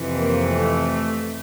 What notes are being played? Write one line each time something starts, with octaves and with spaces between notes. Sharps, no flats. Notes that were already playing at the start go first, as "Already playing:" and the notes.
Already playing: F2 C3 E3
A#3
A3